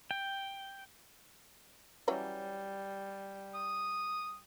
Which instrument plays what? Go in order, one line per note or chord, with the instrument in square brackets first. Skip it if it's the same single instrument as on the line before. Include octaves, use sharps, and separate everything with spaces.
[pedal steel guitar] G5
[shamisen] E3 F#3 C#4 [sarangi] G3
[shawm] D#6